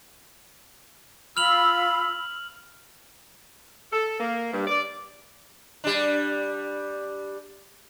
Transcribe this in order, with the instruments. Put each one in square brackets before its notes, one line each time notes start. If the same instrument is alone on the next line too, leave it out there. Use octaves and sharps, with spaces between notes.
[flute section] F4 B5 E6 [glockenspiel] F6 F7 F#7
[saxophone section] A4
A#3
G2
D5
[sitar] G3 D4